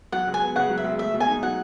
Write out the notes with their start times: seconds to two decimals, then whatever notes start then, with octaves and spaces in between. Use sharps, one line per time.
0.12 F#3 F#5
0.27 C#2
0.34 G#5
0.42 B3
0.55 C#3 F#5
0.70 F#3
0.78 E5
0.84 C#2
0.99 A3 E5
1.14 B2
1.20 G#5
1.28 D#4
1.43 F#3 F#5